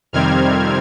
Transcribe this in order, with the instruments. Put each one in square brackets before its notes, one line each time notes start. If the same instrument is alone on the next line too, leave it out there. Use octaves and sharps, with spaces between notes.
[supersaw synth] F2 C3 D#3 G3 C4 F6 G#6